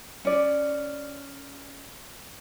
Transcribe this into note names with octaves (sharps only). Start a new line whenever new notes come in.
C#4 D5